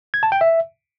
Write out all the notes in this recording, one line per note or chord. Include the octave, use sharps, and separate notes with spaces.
G#6
A5
G5
E5